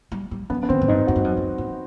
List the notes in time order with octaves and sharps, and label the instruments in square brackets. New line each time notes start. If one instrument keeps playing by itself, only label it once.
[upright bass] G3
G3
[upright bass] F#3 [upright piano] B3
[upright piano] B3
[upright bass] D#3 [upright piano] C4
[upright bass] A2
[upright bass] G2 [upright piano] D#4
[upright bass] F#2 [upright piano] F#4
[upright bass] G2
F#2
F#2
F#2